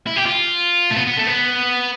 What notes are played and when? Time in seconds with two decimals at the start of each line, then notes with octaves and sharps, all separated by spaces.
0.07 E4
0.16 G4
0.26 F4
0.91 A3
0.96 B3
1.07 B3
1.17 A3
1.27 B3